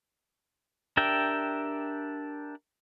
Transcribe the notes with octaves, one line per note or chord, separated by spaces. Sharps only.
D4 G4 A#4 E5 G5